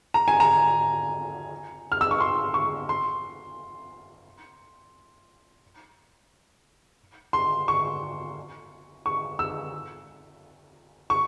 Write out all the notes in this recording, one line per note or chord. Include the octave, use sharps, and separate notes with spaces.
A#5
G#5
A#5
F6
E6
C#6
C6
C#6
C6
C6
C#6
C#6
E6
C#6